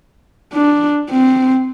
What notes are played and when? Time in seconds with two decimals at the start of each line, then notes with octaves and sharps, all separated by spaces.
0.53 D4
1.10 C4